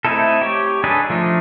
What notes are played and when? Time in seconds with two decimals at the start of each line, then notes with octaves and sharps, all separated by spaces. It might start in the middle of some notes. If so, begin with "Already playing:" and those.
0.05 A3 C4 D#4 E4 A4
0.41 G4 C#5
0.84 D4 D#4 G#4 A4 B4
1.10 F3 A3 D4 D#4